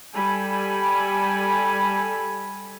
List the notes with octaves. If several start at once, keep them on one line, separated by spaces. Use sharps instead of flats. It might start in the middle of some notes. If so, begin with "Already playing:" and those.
G3 A4 G#5 B5